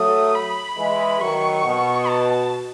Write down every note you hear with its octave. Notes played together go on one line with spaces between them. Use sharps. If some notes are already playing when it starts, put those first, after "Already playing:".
Already playing: F#3 A3 D#6
B5
E3 G#3
D#3 F#3 C#6
B2
A5